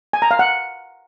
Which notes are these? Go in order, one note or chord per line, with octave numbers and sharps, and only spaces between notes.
G#5
A#5
F5
F#5